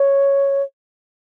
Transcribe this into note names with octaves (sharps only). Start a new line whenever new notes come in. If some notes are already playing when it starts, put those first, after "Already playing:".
Already playing: C#5